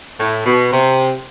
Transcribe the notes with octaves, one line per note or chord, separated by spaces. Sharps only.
A2
B2
C3